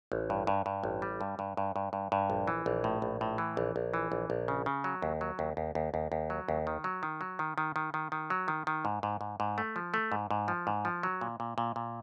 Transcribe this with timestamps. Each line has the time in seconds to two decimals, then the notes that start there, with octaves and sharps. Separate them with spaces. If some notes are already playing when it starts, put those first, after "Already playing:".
0.12 A1
0.30 G2
0.47 G2
0.66 G2
0.84 A1
1.02 G3
1.21 G2
1.39 G2
1.57 G2
1.76 G2
1.93 G2
2.12 G2
2.30 A#1
2.48 E3
2.66 A#1
2.84 A2
3.02 A#1
3.21 A2
3.38 E3
3.57 A#1
3.76 A#1
3.94 E3
4.12 A#1
4.30 A#1
4.48 C#3
4.66 C#3
4.84 F#3
5.02 D#2
5.21 F#3
5.39 D#2
5.57 D#2
5.75 D#2
5.94 D#2
6.12 D#2
6.30 F#3
6.49 D#2
6.67 D#3
6.84 F#3
7.03 D#3
7.21 F#3
7.39 D#3
7.58 D#3
7.76 D#3
7.94 D#3
8.12 D#3
8.30 F#3
8.48 D#3
8.67 D#3
8.85 G#2
9.03 G#2
9.21 G#2
9.40 G#2
9.58 A3
9.76 F3
9.94 A3
10.12 G#2
10.31 G#2
10.48 F3
10.67 G#2
10.85 F3
11.03 F#3
11.21 A#2
11.40 A#2
11.58 A#2
11.76 A#2